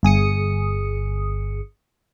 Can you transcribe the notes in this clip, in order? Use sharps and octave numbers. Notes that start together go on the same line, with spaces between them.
G1 G#4 D#6 C#7